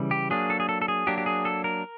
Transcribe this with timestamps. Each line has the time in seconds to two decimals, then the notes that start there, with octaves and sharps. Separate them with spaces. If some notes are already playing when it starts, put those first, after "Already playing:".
Already playing: C#3 E3 G3
0.11 G4
0.30 F#3 A#3 D4 G#4
0.50 A4
0.60 G#4
0.69 A4
0.82 A4
0.88 G#4
1.07 F#3 A#3 D4 G4
1.18 G4
1.26 G#4
1.45 A4
1.64 A#4